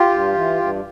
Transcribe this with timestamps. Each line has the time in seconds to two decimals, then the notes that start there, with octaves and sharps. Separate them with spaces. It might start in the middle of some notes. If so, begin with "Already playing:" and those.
Already playing: F4 G4
0.10 G2
0.34 E3
0.57 G2